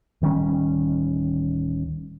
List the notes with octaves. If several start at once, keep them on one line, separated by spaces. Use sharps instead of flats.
D1 D#3 G3 C#4